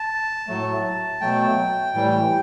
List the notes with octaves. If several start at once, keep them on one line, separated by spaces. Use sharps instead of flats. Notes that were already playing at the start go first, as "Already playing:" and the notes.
Already playing: A5
A2 F#3 A3
B2 F#3 A3 G5
A2 E3 G3